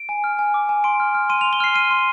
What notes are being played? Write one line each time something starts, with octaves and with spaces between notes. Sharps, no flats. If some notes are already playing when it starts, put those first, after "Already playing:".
Already playing: D7
G#5
F6
G#5
D6
G#5
C6 D7
F6
F6
C6 D#7
F7
C6
G7
F6 C7
F6 D#7
C6